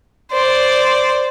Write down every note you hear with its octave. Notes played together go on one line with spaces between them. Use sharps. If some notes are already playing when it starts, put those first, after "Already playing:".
C5 D5